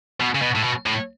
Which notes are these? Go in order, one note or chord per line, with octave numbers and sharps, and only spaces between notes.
B2
C#3
B2
A2
B2
A2